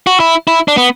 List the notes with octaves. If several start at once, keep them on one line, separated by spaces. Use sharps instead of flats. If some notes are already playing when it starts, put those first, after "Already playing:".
F#4
E4
E4
D4
B3